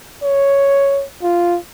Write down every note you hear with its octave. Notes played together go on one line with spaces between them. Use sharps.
C#5
F4